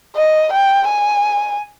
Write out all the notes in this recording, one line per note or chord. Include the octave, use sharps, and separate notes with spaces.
D#5
G5
G#5